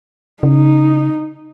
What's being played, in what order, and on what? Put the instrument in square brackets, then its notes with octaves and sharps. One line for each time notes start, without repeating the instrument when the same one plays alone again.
[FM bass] C#3 [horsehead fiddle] D#4